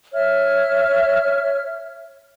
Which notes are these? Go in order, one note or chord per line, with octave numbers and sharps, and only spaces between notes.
C#5 E5 F6